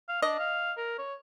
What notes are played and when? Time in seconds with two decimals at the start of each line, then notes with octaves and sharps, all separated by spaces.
0.09 F5
0.22 D4 D#5
0.39 F5
0.77 A#4
0.98 C#5